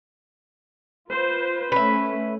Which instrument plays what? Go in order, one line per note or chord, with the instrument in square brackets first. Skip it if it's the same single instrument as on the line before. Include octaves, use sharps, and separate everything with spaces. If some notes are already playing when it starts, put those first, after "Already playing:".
[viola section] F4 B4 C5
[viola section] A3 C#4 [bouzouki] B4 E5